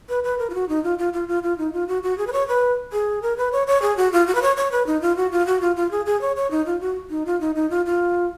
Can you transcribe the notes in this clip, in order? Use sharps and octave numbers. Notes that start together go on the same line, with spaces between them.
B4
B4
A#4
F4
F#4
D#4
F4
F4
F4
F4
F4
D#4
F4
F#4
F#4
G#4
B4
C#5
B4
G#4
A#4
B4
C#5
C#5
G#4
F#4
F4
F#4
B4
C#5
C#5
B4
D#4
F4
F#4
F4
F#4
F4
F4
G#4
G#4
C#5
C#5
D#4
F4
F#4
D#4
F4
D#4
D#4
F4
F4